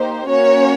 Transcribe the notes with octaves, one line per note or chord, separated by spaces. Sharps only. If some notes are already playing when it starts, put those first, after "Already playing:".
Already playing: A#3 D#4 G4 C5
A#3 C#4 F#4 C#5